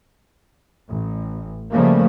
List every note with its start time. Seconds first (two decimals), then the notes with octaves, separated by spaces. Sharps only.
0.89 A1
1.72 C#3 F3 G3 A3 A#3